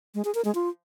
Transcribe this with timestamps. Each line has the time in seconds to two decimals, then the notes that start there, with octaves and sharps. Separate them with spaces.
0.15 G#3
0.25 G#4
0.35 A#4
0.45 G#3
0.55 F4